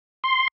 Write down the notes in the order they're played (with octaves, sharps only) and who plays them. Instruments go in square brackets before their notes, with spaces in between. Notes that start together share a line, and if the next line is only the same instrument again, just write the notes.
[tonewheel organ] C6